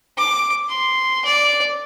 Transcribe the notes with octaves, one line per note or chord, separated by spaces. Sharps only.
D6
C6
D5